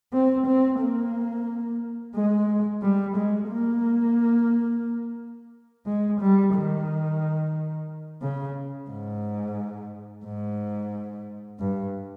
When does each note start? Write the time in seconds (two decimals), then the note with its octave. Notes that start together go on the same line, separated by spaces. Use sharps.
0.13 C4
0.46 C4
0.80 A#3
2.15 G#3
2.82 G3
3.17 G#3
3.50 A#3
5.86 G#3
6.21 G3
6.54 D#3
8.22 C#3
8.90 G#2
10.25 G#2
11.60 G2